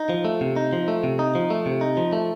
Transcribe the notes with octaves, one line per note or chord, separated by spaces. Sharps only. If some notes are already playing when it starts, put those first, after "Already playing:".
Already playing: D#4
F3
A3
C3
D#4
F3
A3
C3
D#4
F3
A3
C3
D#4
F3
A3